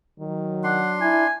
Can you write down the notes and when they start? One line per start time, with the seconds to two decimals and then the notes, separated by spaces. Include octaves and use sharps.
0.20 D#3 F#3
0.64 D4 F#5 C6
1.01 E4 G#5